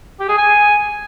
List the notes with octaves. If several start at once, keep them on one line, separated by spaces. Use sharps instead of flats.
G4
G#4
G#5